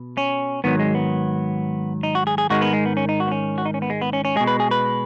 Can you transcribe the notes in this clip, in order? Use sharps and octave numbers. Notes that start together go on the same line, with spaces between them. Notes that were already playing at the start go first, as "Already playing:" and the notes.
Already playing: B2
C#4
G#2 D#3 F#3 B3
G#3
B3
D#4
F#4
G#4
G#4
G#2 D#3 G#3 F#4
B3
G#3
B3
C#4
D#4
F#4
B3
C#4
F#4
D#4
C#4
B3
G#3
B3
C#4
C#4
B2 G#3 G#4
B4
G#4
B4